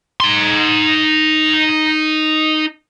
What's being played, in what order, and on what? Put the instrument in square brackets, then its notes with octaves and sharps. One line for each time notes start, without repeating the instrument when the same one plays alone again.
[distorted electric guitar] D#4 C6